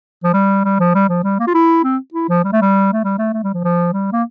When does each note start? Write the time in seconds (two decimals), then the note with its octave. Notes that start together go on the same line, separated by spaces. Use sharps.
0.24 F3
0.34 G3
0.64 G3
0.80 F3
0.95 G3
1.09 F3
1.24 G3
1.39 A#3
1.47 F4
1.54 E4
1.84 C4
2.14 E4
2.29 F3
2.44 G3
2.52 A3
2.61 G3
2.93 A3
3.04 G3
3.18 A3
3.33 A3
3.43 G3
3.54 F3
3.64 F3
3.93 G3
4.12 A#3